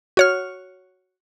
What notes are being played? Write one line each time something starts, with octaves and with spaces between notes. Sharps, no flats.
F#4 C#5 F6